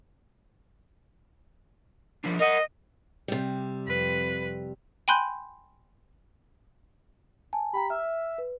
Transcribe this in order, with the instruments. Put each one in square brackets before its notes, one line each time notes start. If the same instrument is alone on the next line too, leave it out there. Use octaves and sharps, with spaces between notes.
[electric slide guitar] F3 G3 D4
[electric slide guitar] A#4 F#5 [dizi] D#5
[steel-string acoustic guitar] C3 G3
[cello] F2 B4
[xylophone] G5 G#5 B5 C6 F#6 G6
[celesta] G#5 A5
[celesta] G4 G5 A#5 [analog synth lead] B5
[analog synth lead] E5 [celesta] F6
[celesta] B4